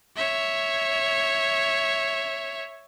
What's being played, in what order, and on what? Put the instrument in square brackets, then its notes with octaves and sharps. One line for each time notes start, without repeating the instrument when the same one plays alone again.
[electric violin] C#5 E5